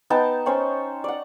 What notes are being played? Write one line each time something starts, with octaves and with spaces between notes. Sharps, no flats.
B3 D#4 G5 A5
C#4 C5 C#5 G5
D5 F#5